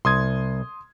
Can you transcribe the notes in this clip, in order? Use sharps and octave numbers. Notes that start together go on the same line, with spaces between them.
C2 C6 D#6 G#6